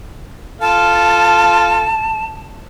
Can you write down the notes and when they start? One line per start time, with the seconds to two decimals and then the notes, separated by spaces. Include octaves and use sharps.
0.61 F4 A4 F5 A5